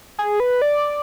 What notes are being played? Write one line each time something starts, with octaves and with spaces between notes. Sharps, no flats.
G#4
B4
D5